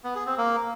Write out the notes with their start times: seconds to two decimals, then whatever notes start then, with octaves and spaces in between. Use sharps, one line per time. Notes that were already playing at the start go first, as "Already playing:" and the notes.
0.04 B3
0.15 G#4
0.26 C4
0.38 A#3